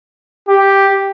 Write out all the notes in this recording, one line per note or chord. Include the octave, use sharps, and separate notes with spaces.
G4